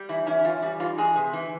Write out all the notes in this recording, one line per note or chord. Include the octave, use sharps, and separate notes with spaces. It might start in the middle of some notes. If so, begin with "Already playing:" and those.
Already playing: G3
E3 E4
C#4 E4
E3 F4
G3
E3 F4
G#3 G#4
C3
E3